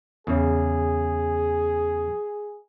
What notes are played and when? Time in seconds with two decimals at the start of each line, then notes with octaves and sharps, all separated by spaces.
0.27 E2 C#3 G#4